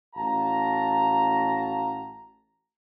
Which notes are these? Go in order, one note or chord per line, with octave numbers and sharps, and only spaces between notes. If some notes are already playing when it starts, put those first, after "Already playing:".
A1 F#4 F5 A5 A#5